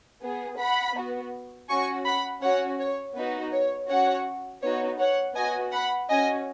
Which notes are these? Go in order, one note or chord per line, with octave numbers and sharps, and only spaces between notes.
B3 G#4
F#5 B5
B3 F#4
C#4 F#4 G#5 C#6
F#5 B5
C#4 F#4 C#5 F#5
C#5
B3 D#4 F#4 B4
C#5
C#4 F#4 C#5 F#5
B3 D#4 F#4 C#5
C#5 F#5
B3 F#4 D#5 G#5
F#5 B5
C#4 F#4 D#5 G#5